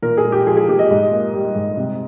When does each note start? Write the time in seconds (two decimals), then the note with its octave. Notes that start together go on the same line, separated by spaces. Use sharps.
0.02 A#2 A#4
0.17 G#4
0.25 G#3
0.32 G4
0.46 F3 G#4
0.57 G#4
0.68 A#2 G4
0.79 D#5
0.91 G#2
1.11 A#3
1.33 G3
1.56 G#2
1.77 C3